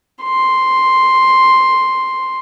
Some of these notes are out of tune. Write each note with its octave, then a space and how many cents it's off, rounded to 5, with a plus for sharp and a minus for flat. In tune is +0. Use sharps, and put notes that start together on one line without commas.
C6 +0